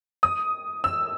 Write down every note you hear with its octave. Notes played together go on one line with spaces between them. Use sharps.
D#6
E6